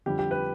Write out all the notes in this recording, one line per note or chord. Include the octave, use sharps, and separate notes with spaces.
F2 D3 G3 G4
G4
B4